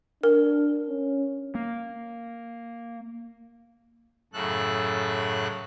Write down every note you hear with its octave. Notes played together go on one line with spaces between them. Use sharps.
D4 A#4
C#4
A#3
F#2 A2 C#3 A4 F#6